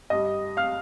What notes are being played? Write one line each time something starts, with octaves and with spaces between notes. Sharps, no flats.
G2 G3 D#5 D#6
F5 F6